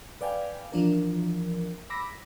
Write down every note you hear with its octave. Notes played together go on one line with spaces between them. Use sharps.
B4 D5 F5 G5 G#5
E3 F3 D4 A#4
B5 D6 E6 A#6 B6